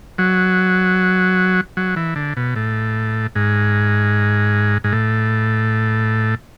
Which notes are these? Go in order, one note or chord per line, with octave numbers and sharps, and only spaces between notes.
F#3
F#3
E3
D3
B2
A2
G#2
G#2
A2